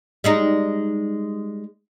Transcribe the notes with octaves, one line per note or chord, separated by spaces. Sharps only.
G3 G#3 D#4